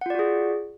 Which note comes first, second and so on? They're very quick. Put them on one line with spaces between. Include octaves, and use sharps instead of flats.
F#5 F4 D5 F#4 G#4